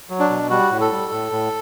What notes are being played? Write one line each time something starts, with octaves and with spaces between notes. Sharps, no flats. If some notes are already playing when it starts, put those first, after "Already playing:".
F#3
D4
B2
G3 F#4
A2
A4
G3
A2
A2